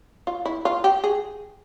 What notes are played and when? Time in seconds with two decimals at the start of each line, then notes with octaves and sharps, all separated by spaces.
0.27 F4
0.45 E4
0.65 F4
0.84 G4
1.04 G#4